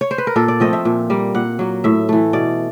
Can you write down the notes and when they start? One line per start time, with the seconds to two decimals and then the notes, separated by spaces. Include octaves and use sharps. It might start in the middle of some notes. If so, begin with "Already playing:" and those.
0.01 C#5
0.11 C5
0.18 B4
0.27 A#4
0.36 A#2 A4
0.48 D5
0.60 F3 A3 C4 D#5
0.73 E5
0.85 A#2
1.10 G3 A#3
1.35 A#2 F#5
1.59 F#3 A#3
1.84 A2 E5
2.09 E3 A3
2.33 B2 D5